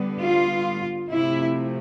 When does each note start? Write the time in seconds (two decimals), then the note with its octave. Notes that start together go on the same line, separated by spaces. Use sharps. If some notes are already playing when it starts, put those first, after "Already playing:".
Already playing: D3 G3 B3
0.21 F4
1.11 C3 F3 A3 E4